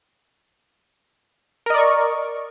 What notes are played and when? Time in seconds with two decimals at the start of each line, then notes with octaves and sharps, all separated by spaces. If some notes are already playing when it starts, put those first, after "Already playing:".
1.66 A#4
1.70 D#5
1.74 D5
1.78 C#6